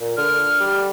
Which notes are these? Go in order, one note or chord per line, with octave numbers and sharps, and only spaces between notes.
A#2
D3 F6
G3